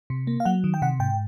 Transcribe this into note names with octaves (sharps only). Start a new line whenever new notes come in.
C3
A#3
F5
F#3 F#5
D#3
G5
C3 F#5
G#2 G5